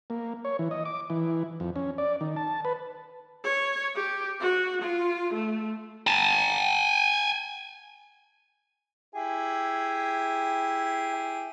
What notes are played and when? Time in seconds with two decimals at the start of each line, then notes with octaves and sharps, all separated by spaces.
0.10 A#3
0.45 C#5
0.59 E3
0.71 D#5
0.85 D6
1.10 E3
1.60 F2
1.76 C#4
1.98 D5
2.21 D#3
2.36 A5
2.65 B4
3.44 C#5
3.95 G4
4.40 F#4
4.82 F4
5.34 A3
6.07 G#5 A5
9.15 E4 G4 G#4